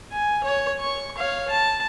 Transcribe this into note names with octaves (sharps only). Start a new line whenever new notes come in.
G#5
C#5
C#6
C#5 F5
A5